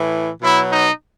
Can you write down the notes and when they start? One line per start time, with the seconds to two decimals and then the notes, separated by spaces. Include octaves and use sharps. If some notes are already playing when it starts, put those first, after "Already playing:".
Already playing: A2 E3
0.41 B2 F#3 E4
0.70 D#4